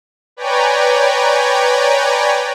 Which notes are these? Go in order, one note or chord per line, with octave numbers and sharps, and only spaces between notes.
B4 C#5 D5 G5 G#5 A#5